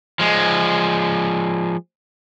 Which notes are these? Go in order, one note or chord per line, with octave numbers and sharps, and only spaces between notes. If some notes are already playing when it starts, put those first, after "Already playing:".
F3 G#3